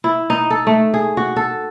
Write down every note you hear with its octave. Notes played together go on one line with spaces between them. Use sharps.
E4
D#4
A4
A3
G#4
F#4
A4